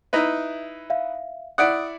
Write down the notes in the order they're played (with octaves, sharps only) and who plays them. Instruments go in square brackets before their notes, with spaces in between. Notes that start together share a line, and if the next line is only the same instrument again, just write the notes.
[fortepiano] D#4 E4 B4 [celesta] E5
[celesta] E5 F5
[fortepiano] E4 D5 F#5 [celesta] D#6 D7